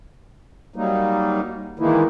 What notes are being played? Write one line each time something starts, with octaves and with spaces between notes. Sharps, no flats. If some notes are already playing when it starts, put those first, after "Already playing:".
F#3 G3 A#3 D#4
D#3 E3 G#3 A#3 D#4 E4